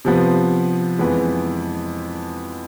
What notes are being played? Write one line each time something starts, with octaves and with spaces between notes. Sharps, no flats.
C3 F3 B3
F2 E3 G#3 B3